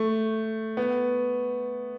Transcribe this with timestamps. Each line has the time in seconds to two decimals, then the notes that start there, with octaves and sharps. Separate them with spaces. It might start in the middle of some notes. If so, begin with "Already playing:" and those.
Already playing: A3
0.77 B3